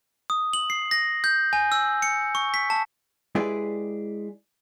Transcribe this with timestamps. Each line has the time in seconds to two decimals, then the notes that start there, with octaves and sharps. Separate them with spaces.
0.30 D#6
0.53 F#7
0.70 C7
0.91 A#6
1.24 G6
1.53 G#5
1.72 E6
2.02 C#7
2.35 C#6
2.54 B6
2.70 A5
3.35 G#3 E4 G4 G#4 B4 D5